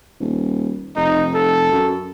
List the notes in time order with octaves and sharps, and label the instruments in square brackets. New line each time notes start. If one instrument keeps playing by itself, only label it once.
[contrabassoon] D#1
[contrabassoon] F1 [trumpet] D#4
[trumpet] A4
[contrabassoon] F#2